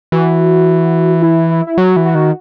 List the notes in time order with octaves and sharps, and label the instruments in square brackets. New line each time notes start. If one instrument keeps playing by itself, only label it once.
[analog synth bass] E3 [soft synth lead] F#4
[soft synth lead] E4
E4
E4
[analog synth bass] F#3 [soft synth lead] F#4
[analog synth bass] E3
[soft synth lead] F#4
[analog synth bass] D#3